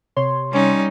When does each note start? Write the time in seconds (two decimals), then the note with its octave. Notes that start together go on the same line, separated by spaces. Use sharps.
0.17 C3 C#5 C6
0.52 G3 C#4 D#4